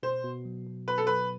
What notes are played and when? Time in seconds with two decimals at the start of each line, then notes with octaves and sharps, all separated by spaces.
0.03 B2 C5
0.24 B2
0.45 F#3
0.66 B2
0.88 B2 B4
0.98 A4
1.07 F#3 B4